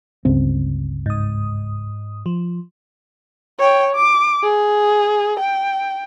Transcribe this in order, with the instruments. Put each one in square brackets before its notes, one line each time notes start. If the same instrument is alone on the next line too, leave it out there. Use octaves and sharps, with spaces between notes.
[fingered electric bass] G1 C#2 C4
[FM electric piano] G#2 D#6
F3
[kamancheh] C#5 G5
D6
G#4
G5